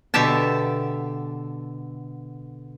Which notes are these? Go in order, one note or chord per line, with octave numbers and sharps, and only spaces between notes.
B2 D3 G4 E5 A5